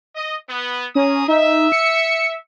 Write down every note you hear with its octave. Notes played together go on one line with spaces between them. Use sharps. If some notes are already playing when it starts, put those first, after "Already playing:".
D#5
B3
C#4 G#4 A#5 D#6
D#4 E5
C#7